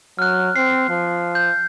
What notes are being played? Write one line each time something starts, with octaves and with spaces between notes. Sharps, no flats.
F#3 F6 F#6
C4 C7
F3
G6